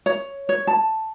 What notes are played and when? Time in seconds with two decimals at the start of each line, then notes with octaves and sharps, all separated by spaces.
0.06 C#5
0.49 C#5
0.67 A5